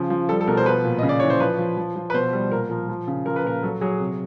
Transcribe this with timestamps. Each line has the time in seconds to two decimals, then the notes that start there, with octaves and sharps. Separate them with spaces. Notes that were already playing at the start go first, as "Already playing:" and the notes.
Already playing: C#3 F3
0.10 F3
0.29 G3 A4
0.41 A4
0.48 B2 A#4
0.57 C5
0.66 F3 B4
0.84 A#2
0.99 C#3 D#5
1.09 D5
1.20 E3 C#5
1.30 C5
1.40 F3 B4
1.59 F3
1.77 F3
1.96 F3
2.10 B4
2.14 B2 C5
2.33 G3
2.51 A#2 A#4
2.70 F3 A#4
2.89 F3
3.08 C#3
3.26 F3 A#4
3.36 B4
3.44 A#2 A#4
3.63 F#3 A4
3.81 F#3 G#4
4.00 C3